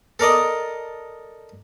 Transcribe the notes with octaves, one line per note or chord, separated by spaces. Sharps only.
A4 A#4 D5 D#5